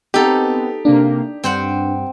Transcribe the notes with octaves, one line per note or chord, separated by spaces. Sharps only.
B3 C4 D#4 G4 A4
C3 A#3 D4
G2 C4 C5 F#5